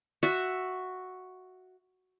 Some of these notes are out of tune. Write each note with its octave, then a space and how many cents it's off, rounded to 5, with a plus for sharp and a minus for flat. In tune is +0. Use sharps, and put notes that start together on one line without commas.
F#4 +0 E5 +5